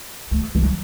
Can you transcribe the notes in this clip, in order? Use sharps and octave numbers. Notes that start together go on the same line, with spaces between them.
A3
E3
F#3